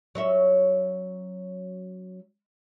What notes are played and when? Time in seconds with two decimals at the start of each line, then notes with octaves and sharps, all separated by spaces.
0.15 F#3 C#4 E5